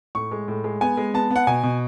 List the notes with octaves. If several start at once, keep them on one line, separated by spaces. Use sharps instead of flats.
A2 C#6
G#3
A2
G#3
B3 G#5
G#3
B3 A5
B3
F#5
B2 G#5
B2